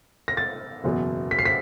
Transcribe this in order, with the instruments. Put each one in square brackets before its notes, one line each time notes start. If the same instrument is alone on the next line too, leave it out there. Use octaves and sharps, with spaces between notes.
[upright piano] A#6
A6
F#1 E2 B2 F#3
B6
C7
B6